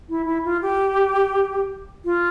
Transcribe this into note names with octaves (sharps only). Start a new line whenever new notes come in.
E4
E4
F4
G4
F4